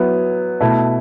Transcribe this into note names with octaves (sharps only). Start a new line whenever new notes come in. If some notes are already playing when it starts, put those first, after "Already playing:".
Already playing: F#3 B3 E4
B2 A3 E4